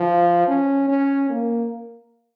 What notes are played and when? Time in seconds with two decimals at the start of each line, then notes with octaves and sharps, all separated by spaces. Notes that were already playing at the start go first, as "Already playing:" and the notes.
Already playing: F3
0.48 C#4
0.88 C#4
1.30 A#3